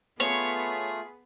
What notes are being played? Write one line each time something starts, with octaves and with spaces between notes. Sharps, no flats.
A3 B3 F4 G#4 C#5